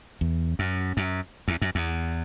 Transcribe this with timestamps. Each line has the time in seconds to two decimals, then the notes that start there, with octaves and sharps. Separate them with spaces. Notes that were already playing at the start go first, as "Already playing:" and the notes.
0.21 E2
0.59 F#2
0.97 F#2
1.48 E2
1.61 F#2
1.75 E2